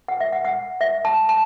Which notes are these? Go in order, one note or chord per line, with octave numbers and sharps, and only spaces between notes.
F#5
E5
F#5
F#5
E5
A5
A5